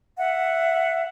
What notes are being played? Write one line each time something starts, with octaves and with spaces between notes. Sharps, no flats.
E5 F#5